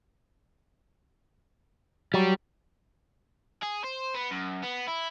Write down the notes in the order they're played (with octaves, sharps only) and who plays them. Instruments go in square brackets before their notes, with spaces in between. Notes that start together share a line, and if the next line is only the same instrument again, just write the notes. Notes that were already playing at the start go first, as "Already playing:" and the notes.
[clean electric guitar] F#3 [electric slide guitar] G3
[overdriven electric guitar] G#4
C5
B3
F#2
B3
E4